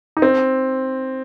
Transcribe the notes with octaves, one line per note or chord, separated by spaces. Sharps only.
D#4
C4